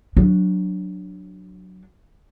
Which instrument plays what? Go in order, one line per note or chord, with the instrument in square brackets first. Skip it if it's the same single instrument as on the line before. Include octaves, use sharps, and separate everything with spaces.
[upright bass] F#3 D4